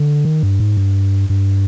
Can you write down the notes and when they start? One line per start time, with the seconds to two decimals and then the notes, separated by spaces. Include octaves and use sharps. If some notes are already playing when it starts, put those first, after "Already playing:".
Already playing: D3
0.25 D#3
0.43 G2
0.60 G#2
0.77 G2
1.30 G2